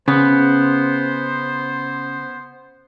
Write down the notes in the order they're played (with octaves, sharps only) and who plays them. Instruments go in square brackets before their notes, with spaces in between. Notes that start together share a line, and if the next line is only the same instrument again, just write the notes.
[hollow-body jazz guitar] C#3 [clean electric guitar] B3 [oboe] C5